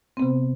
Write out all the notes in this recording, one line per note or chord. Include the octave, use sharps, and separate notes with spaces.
C3 B3 C4